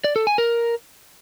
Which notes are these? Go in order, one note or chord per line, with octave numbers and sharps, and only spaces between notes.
D5
A4
G#5
A#4